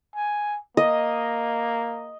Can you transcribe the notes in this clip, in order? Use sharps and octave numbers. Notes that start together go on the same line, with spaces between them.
G#5
A#3 D#5